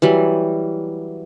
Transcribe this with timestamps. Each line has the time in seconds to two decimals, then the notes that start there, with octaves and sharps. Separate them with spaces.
0.02 E3 F#3 G3